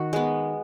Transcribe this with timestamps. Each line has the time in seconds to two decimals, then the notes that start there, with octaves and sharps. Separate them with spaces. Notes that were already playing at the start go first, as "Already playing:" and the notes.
Already playing: D#3 F#4
0.13 G#3 B3